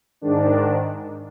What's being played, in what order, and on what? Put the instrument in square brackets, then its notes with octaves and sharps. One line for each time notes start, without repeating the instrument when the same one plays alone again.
[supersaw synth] G#2 D#3 D4